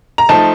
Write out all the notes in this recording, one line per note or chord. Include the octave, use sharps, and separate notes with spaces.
A#5
F3 A3 D#4 A5